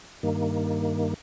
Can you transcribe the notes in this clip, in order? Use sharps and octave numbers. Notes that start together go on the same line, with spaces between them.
G2 D#3 A#3